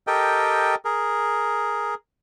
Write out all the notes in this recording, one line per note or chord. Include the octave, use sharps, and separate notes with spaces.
G4 A4 A#4 D#5 G5
G#4 A#4